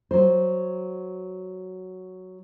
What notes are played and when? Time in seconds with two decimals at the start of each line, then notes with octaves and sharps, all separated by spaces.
0.11 F#3 C5